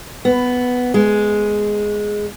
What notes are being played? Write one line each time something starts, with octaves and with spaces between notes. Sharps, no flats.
B3
G#3